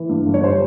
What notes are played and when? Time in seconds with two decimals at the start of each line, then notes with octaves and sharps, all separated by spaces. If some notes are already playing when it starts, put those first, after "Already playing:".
Already playing: E3
0.09 G2
0.26 G1
0.34 C#5
0.44 G3 C5